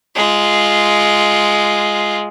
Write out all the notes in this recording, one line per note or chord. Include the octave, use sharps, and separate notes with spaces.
G#3 F4